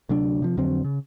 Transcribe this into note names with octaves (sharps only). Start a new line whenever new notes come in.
D2 C3 F#3 D4
C3 F3
F2 D3 F#3 C4
C#3